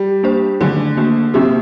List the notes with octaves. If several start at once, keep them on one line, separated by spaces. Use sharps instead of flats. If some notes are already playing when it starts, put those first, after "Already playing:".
Already playing: G3
A#3 D4 G4 C5
D3 D#3 F#3 A3 D4
A#3 D4 F#4
C3 F#3 A#3 D4 F#4